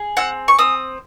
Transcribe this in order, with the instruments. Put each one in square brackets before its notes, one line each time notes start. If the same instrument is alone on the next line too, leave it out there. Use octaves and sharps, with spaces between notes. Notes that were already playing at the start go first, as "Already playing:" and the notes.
Already playing: [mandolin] G#4
C4 F#5
C#6
C4 D#6